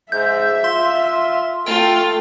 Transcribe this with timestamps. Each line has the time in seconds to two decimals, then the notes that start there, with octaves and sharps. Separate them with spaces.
0.12 G#2 E5 G6
0.64 F4 C6
1.66 A3 F4 G5